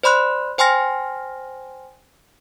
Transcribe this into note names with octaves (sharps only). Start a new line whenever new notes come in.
C5 D5 B5 C6 F#6
C5 G5 G#5 C6 F6 A#6